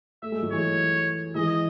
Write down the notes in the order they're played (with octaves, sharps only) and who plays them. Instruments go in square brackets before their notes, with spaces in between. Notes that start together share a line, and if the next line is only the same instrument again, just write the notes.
[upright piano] A3 [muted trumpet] E5
[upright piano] G#3
F#3
[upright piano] E3 G#3 [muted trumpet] C#5
[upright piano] E3 G#3 [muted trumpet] D#5